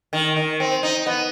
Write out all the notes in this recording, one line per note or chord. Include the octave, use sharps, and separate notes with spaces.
D#3
D#3
C4
D#4
B3